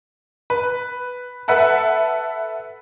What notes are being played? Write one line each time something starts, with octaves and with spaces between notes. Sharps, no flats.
B4
A4 B4 E5 F#5 A5